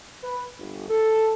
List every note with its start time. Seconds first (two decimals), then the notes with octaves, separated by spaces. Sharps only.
0.23 B4
0.58 G1
0.89 A4